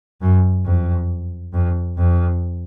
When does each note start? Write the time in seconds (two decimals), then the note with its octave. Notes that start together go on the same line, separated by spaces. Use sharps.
0.22 F#2
0.66 F2
1.54 F2
1.97 F2